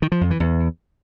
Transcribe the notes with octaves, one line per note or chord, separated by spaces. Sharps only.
D#3
F3
F2
E3
E2